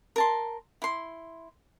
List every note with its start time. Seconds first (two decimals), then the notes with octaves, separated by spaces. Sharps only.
0.16 A#4 A5 C6
0.82 E4 C6